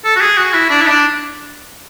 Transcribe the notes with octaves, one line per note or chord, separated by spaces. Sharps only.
A4
F#4
G#4
F#4
E4
D4
E4
D4